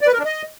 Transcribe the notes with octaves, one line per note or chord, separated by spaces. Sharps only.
D5
B4
A#4
D4
D#5